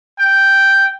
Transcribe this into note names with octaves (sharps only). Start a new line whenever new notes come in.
G5